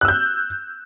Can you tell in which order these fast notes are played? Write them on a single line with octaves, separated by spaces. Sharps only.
F#6 E6 G6